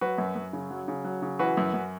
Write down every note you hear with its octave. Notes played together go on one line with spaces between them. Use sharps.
F#3 F#4 B4
F#2
F#2
C#3
F#3
C#3
F#3
C#3
E3 F#4 B4
F#2
F#2